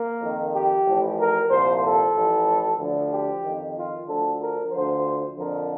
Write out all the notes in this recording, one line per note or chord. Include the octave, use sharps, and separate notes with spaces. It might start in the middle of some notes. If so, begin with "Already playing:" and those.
Already playing: A#3
F2 D#3
G4
A1 A2 F3
A#4
C2 A#2 F3 C5
A4
A1 A2 F3
D2 D3 F3
G4
F2 D#3
F4
D2 D3 F3 A4
A#4
D2 D3 F3 C5
F2 D3 F3 A#4